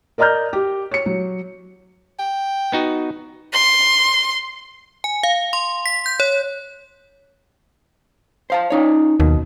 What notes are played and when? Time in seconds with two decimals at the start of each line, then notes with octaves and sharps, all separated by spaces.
0.18 A#4 D5 D#5 A#5 F6 G6
0.53 G4
0.91 C#5 C#7
1.06 F#3
2.19 G5
2.72 B3 D#4 F#4
3.53 C6
5.04 G#5
5.23 F5
5.53 C6
5.86 B6
6.06 G6
6.20 C#5
8.50 C5 F5 A5
8.70 C#4 D#4 C#5
9.20 D#2 B2